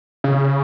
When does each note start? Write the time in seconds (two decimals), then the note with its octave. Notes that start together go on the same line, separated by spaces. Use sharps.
0.24 C#3